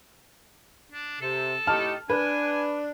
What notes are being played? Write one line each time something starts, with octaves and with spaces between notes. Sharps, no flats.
D4
C3 A4
A2 D#4 G4 A5 F6
D4 B4 G#5